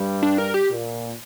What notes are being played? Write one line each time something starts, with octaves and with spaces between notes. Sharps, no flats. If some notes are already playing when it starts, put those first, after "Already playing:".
Already playing: G2 G3
D4
A#4
G4
A#2